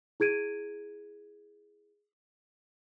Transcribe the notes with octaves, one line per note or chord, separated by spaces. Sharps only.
E4 G#4 G#6 D7 D#7